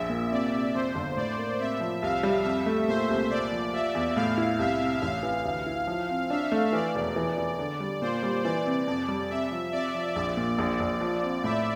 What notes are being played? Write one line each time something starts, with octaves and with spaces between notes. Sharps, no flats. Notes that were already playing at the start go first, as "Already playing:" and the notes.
Already playing: A#1 E5
A#2
C3 D5
C3
F2 C5
G1
A2 D5
A#3
C3 E5
F3
C2 F5
G3
F2 E5
A3
A#2 C5
C2
A#2 D5
F3
F4 E5
E2
A2 F5
E4
C2 E5
C3
A1 F5
E3
D2
E4
F3
C4
D4 E5
A3
E3 D5
E1
E3
E3
D3
G3
A#2 C5
G3
E3 D5
C3
F2 D5
G3
C3 E5
F3
C3 D5
F3
A#1 D5
A#2
A#1
A#1
F3
C4
A2 E5